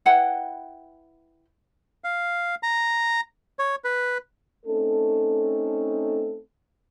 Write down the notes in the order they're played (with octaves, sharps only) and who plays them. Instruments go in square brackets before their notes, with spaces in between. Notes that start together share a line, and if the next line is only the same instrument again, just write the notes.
[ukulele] E4 B4 F#5 G5
[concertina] F5
A#5
C#5
B4
[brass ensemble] A3 C4 C#4 D#4 A4